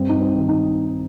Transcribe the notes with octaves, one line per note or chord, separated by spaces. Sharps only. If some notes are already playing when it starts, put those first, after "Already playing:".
Already playing: G2 C4
D#4
C4
D#3
D#4